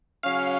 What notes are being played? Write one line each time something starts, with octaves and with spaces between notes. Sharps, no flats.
C#3 F#3 C#4 F5